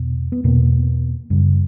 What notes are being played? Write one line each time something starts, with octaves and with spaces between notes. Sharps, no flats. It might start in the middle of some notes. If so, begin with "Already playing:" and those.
Already playing: E2 B2
B3
E2 B2 A#3
F#2 C#3 G3